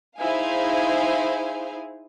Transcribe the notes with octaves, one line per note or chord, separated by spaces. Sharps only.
D#4 E4 G#4 C5 F5 G#5